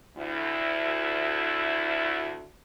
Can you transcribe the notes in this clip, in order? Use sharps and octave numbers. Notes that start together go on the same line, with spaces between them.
D2 E4